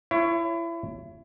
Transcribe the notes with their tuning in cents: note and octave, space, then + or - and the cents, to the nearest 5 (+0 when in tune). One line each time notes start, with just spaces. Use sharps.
E4 +30 C#5 +0